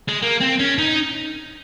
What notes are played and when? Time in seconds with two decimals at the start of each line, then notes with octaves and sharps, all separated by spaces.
0.08 G#3
0.22 A#3
0.40 C4
0.59 C#4
0.78 D#4